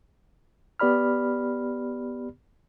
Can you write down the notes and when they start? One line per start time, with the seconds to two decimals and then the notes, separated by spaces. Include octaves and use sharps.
0.80 B3 G4 D5 B5 F6